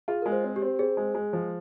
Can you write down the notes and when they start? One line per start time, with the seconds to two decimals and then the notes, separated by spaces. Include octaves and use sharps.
0.08 F4 G#4
0.22 G#3 A#4
0.32 C5
0.44 C4
0.56 G4
0.62 C4
0.79 C4 G#4
0.97 G#3
1.15 G#3
1.33 F3